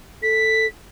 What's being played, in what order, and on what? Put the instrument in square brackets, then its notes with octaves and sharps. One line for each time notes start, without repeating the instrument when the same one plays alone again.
[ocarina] A4 [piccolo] B6